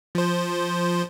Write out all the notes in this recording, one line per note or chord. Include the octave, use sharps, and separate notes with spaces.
F3 C5